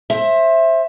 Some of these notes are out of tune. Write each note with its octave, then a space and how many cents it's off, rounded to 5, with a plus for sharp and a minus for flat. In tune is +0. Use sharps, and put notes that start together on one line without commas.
C5 +25 E5 +0